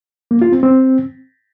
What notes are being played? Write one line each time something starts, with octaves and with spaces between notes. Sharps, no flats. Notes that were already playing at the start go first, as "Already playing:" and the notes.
A#3
F4
C4
C4